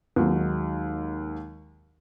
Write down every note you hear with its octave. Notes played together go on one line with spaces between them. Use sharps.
D#2 F#3 G#3